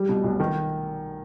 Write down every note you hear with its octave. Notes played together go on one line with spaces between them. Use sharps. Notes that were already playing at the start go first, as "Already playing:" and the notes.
Already playing: G3
B2
B1
D#3